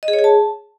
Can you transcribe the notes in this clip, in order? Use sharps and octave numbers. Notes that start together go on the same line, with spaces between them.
D#5
G#4
C#5
G#4
A5